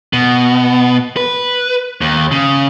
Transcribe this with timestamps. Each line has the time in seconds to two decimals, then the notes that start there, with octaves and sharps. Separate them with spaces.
0.13 B2
1.17 B4
2.01 D#2
2.32 C#3